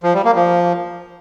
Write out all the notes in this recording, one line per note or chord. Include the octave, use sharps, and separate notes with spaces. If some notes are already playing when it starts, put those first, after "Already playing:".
F3
G3
A#3
F3